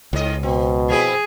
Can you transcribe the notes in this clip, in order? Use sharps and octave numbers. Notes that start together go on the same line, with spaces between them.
C#2 G#2 D#5
B2 C4
F3 C4 E4 G#4